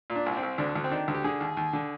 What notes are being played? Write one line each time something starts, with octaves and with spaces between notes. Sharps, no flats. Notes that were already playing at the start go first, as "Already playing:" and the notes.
A#2
D4
C2
C4
C2
D2 D4
D2
C4
D#3 D4
D2
G4
D3 G#4
D#2
D#2
D3